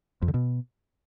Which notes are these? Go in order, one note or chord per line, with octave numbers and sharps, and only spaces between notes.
F2
D3
B2